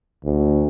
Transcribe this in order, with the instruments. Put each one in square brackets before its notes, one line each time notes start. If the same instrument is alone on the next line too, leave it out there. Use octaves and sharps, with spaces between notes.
[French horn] D2